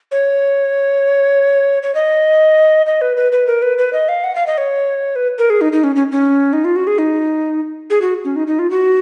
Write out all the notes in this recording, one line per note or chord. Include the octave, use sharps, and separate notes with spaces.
C#5
C#5
D#5
D#5
B4
B4
B4
A#4
B4
B4
D#5
F5
F#5
F5
D#5
C#5
B4
A#4
G#4
D#4
D#4
C#4
C#4
C#4
D#4
F4
F#4
G#4
D#4
G#4
F#4
C#4
D#4
D#4
F4
F#4